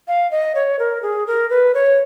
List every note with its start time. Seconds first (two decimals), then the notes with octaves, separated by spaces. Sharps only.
0.08 F5
0.31 D#5
0.55 C#5
0.79 A#4
1.02 G#4
1.27 A#4
1.50 B4
1.75 C#5